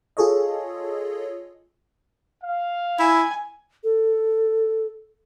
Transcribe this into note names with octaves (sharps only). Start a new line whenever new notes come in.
F4 G#4 A4 C#5 D#5
F5
E4 G#5
A4